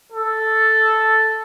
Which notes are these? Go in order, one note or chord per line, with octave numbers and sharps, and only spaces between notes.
A4